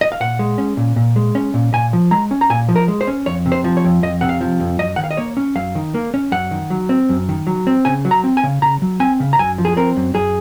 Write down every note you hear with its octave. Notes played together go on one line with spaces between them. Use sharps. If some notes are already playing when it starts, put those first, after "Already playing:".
D#5
F5
A#2 F#5
G#3
C#4
A#2
A#2
G#3
C#4
A#2
A#2 G#5
F3
G#3 A#5
C#4
A#5
A#2 G#5
F3
A#4
G#3
C5
C#4
F2 C#5
C3
C5
F3
C#5
F2
F2 D#5
C3 F#5
F5
F3
F2
F#2 D#5
D#3 F#5
F5
D#5
A#3 C#5
C#4
F#2 F5
D#3
A#3
C#4
F#2 F#5
D#3
F#3
C4
F#2
D#3
F#3
C4
C#3 G#5
F#3
A#5
C4
G#5
C#3
C#3 A#5
F#3
C4 G#5
C#3
A#5
F#2 G#5
F3
G#4
C4 A#4
F#2
F#2 G#4